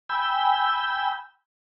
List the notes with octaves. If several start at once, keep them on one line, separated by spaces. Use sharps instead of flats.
G5 G#5 B5 E6 G6